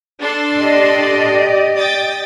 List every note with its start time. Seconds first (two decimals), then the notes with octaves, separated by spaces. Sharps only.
0.21 D4 A4 C6
0.58 G4 D5 D#5
1.77 G5 D#6 A6